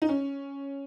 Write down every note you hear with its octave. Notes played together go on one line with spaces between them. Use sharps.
D#4
C#4